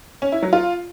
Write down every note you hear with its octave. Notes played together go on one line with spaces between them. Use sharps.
C#4
E4
F#3
F4